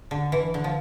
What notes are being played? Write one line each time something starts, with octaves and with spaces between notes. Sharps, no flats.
D3
E3
D3
F3